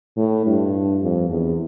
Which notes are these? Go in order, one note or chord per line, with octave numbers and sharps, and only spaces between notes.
A2
G2
F2
E2